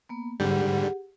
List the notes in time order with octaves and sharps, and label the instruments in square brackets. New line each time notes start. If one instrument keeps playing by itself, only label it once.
[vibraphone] A#3 B3
[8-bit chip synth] G#2 D3 G3 [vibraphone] G4 G#4 F#5